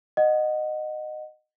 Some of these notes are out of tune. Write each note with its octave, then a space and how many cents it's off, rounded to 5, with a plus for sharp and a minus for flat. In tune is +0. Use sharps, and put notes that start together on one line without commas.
D#5 -15 F#5 +0